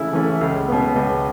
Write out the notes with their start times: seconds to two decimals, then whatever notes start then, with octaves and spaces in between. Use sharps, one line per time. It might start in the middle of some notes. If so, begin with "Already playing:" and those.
Already playing: C#3 E3 A3 C#4 E4
0.13 E3 A3 C#4
0.41 C#2
0.68 B2 B3
0.96 C#2